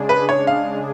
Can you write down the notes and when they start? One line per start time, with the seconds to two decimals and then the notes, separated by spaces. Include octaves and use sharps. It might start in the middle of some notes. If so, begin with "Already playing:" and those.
Already playing: C#3 G#3 D4 G#4
0.09 B4
0.29 C#5
0.47 F5